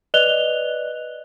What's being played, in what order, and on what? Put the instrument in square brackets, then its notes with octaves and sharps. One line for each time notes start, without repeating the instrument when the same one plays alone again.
[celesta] B4 D5 D#5 F#6 F7 G7